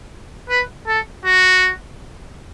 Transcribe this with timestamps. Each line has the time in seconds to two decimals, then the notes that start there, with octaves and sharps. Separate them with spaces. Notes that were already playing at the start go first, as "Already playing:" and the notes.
0.49 B4
0.87 A4
1.25 F#4